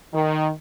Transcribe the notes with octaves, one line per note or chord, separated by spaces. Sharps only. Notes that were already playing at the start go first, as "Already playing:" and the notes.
D#3